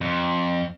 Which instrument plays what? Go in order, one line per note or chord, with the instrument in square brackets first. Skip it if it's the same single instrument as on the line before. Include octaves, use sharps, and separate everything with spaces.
[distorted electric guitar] F2